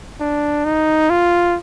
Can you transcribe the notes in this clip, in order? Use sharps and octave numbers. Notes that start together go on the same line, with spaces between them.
D4
D#4
F4